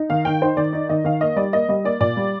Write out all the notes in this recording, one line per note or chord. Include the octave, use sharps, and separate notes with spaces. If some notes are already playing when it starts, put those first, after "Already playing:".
Already playing: D#4
D#3 F5
D#3 G5
D#4 C5
D#3 D5
D#4
D#3 D#5
D#3 F5
A#3 D#5
G3 D5
A#3 D#5
G3 D#5
A#3 D5
A#2 D5
G3